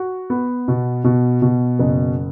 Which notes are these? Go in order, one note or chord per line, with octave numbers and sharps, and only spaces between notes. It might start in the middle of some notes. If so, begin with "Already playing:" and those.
Already playing: F#4
B3
B2
B2
B2
F#1